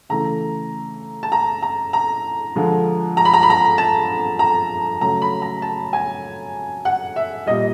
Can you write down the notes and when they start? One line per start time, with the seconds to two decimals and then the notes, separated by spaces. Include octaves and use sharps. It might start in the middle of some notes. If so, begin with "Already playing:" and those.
0.09 C#3 E3 A3 A#5
1.23 A5
1.32 A#5
1.62 A#5
1.93 A#5
2.56 D3 F3 G#3
3.17 A#5
3.25 B5
3.34 A#5
3.43 B5
3.50 A#5
3.78 A5
4.39 A#5
5.00 C#3 F#3 A3 A#5
5.22 B5
5.42 A#5
5.62 A5
5.93 G#5
6.85 F#5
7.16 E5
7.46 A#2 G3 D#5